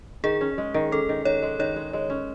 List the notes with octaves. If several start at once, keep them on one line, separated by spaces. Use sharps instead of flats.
D#3 G#4
C#4
G#3
D#3
C#4 A4
D#3
D#3 C#5
G#3
D#3 C#5
G#3
G#3
C#4